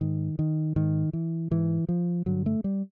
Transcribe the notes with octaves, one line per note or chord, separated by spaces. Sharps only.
G#2 D#3
D#3
G#2 D#3
E3
G#2 E3
F3
G2 D3 F#3
A3
G3